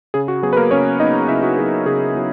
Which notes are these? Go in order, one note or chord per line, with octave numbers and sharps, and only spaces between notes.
C#3 G#4
F#4
F#3 B3 G#4
B4
A#3 A#4
C#3 C#4 C#5
F#3 B3 D#4 D#5
C#3 E4 E5
F#4
F#3 B3 G#4
C#3 G#4
F#3 B3